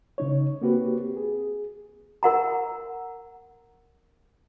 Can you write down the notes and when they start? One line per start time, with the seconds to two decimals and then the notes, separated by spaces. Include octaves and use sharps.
0.18 C#3 D#4 C#5
0.62 A#3 C4 F#4 G4 B4
1.17 G#4
2.23 A#4 F#5 A#5